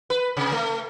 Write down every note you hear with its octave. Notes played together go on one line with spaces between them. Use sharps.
B4
C3
A3